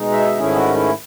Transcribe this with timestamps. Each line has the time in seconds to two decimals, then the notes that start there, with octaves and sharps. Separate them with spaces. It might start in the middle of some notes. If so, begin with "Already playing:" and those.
Already playing: B2 G#3 D#4
0.12 E5
0.38 G#2 D#3 A3 C#4 E4 G#4
0.56 F#4
0.74 E4